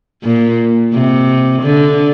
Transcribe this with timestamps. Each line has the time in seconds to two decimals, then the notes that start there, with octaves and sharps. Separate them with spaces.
0.23 A#2
0.93 C3
1.62 D3